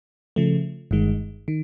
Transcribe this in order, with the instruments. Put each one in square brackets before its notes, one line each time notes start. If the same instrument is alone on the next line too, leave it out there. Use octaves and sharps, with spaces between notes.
[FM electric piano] C#3 F3 A3
G1 G2 D#3 G#3
D#3